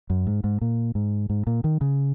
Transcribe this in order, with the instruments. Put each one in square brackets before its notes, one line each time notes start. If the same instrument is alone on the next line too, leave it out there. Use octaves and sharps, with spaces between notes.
[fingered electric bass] F#2
G#2
G#2
A#2
G#2
G#2
A#2
D#3
C#3